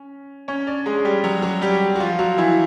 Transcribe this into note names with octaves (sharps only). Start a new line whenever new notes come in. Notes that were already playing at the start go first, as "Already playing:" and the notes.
Already playing: C#4
C#4 C#5
D4 D5
G#3 G#4
G3 G4
F#3 F#4
F#3 F#4
G3 G4
F#4
F3 F4
F#3 F#4
E3 E4